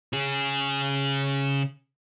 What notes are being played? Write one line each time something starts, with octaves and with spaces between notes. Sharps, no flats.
C#3 G#4